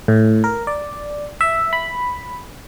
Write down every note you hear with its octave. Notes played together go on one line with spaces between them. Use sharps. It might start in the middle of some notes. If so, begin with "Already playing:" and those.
A2
A#4
D5
E5
B5